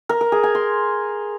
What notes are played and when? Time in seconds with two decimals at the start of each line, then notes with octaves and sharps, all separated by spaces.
0.09 A#4
0.21 A#4
0.32 G#4
0.43 G#5
0.55 C6